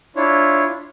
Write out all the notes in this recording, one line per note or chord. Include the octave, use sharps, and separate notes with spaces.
D4 E4 F4 C#5